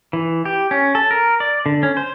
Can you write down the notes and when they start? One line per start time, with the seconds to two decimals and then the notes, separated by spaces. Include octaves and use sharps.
0.13 E3
0.45 G4
0.71 C#4
0.95 A4
1.11 A#4
1.40 D5
1.66 D3
1.83 C#4
1.97 C5